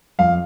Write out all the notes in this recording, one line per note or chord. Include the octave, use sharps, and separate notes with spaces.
F2 F5